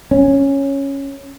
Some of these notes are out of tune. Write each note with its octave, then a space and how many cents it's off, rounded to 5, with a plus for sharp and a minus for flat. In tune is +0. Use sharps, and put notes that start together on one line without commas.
C#4 -5